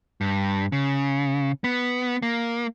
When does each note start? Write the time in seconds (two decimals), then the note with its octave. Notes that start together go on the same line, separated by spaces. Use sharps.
0.21 G2
0.72 C#3
1.64 B3
2.22 A#3